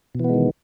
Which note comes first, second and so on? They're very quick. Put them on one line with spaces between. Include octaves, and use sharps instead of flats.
B2 E3 B3 G#3 D#3